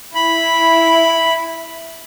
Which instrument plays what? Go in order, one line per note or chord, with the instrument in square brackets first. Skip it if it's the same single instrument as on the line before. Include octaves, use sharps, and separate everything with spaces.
[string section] E4 [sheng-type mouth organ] B5